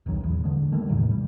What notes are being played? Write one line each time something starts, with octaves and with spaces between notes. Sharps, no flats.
E1 B1 D#3 F#3
D1 E2
D3 G#3
D#3 G3 A3 A#3
E2 A2 C3 D#3
G3